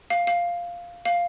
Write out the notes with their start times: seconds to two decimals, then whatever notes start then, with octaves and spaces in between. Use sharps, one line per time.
0.10 F5
0.27 F5
1.05 F5